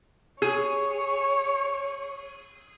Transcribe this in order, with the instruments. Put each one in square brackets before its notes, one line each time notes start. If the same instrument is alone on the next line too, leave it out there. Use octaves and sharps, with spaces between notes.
[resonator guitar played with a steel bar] G#4 [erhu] C#5